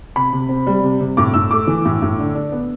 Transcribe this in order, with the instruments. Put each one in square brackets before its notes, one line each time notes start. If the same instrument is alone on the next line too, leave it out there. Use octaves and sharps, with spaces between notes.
[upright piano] C3 B5
C3
C4
G3
C3
C3
A2 D6
A2 E6
A3 D6
E3
A2
A2
D3
D4
B3